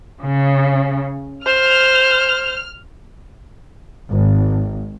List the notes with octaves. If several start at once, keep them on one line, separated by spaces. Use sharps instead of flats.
C#3
C5 F6
G#1